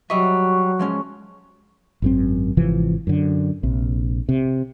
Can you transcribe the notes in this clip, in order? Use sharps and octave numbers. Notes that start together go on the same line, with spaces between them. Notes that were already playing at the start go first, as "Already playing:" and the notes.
F#3 G3 D#5 E5 C#6
F3 G#3 C#4
G#1 F#2 C4
G#1 C3 E3 F3
F#2 D3
A#1 C3
C3